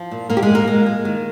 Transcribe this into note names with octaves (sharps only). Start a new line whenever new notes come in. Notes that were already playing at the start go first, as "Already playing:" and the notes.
Already playing: F3
A#2
A#2 A#3 A#4
G4
G#3 G#4
A#2
A#3 A#4
G#3
G#3
D#3